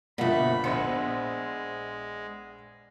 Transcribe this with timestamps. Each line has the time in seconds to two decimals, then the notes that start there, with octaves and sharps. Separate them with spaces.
0.18 G1 B2 F3 A3 A#3 B5
0.64 A#1 G#3 B3 C5 C#7